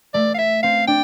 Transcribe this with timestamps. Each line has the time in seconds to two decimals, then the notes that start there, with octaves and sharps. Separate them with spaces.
0.14 A3 D5
0.34 F5
0.38 E5
0.63 C4 F5
0.87 D4 G5